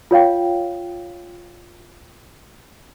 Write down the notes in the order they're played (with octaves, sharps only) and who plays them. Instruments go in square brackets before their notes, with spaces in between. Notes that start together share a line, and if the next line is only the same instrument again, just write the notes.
[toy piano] F4 C#5 F5 G5